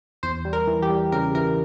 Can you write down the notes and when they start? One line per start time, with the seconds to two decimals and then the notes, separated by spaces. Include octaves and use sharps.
0.23 E2 C5
0.45 G3
0.53 A#4
0.67 E3
0.82 G4
0.90 G3
1.12 C#3 A#4
1.35 E3 A#4